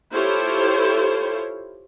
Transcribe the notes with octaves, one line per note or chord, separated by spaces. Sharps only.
E4 F4 G4 A4 C5 C#5